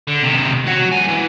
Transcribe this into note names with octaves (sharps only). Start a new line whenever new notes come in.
D3
C3 D#3
F#4 C#5
C2 G#5
E3